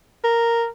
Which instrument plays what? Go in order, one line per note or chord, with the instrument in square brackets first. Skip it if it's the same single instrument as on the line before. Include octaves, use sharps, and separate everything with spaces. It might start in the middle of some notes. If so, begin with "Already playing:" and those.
[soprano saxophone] A#4